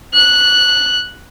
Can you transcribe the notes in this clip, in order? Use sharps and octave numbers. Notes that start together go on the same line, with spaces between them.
F#6